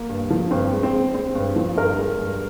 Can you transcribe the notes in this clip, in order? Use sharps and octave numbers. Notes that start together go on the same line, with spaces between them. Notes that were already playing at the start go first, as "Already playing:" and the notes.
Already playing: A#3
G2
F3
G2 C4
G#3
C4
G#3
G#3 C4
G2
F3
G2 A#4
G#3
G2